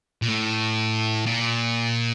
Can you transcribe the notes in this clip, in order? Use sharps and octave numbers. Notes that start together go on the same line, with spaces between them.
A#2
A2
A#2